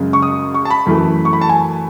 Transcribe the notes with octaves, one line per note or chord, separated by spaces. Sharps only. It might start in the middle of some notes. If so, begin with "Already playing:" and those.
Already playing: F#2 C#3 G#3
C#6
D#6
C#6
A5
B5
F#2 E3 A3 B5
C#6
B5
A5
G#5